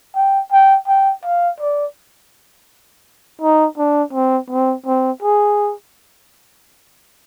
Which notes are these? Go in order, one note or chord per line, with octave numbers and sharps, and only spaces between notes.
G5
G5
G5
F5
D5
D#4
D4
C4
C4
C4
G#4